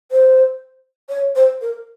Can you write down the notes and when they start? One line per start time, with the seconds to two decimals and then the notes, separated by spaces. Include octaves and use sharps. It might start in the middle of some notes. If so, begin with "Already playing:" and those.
0.11 C5
1.09 C#5
1.36 C5
1.61 A#4